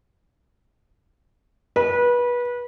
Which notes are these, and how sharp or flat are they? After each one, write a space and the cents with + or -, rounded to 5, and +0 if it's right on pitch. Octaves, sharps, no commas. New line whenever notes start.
B4 -25